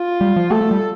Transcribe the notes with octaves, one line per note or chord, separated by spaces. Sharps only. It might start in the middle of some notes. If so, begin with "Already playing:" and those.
Already playing: F4
G3
F3
A3 A4
A3
G3